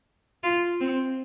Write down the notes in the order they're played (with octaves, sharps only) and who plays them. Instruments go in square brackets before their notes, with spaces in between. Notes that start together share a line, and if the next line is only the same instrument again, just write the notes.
[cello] F4
C4